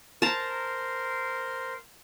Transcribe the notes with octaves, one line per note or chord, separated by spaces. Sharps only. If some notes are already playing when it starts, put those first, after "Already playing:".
A#4 C5 A5 A#5